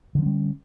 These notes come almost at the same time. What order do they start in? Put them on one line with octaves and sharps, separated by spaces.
D3 F3 C#4 G3